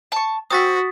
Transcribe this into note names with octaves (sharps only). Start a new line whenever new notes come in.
A5 C#6
C4 F#4 D#6 A6 B6